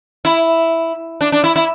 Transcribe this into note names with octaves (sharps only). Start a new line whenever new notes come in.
E4
D4
D4
E4
E4